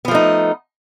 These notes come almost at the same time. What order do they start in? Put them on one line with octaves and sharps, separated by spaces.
B3 F3 A3 D#4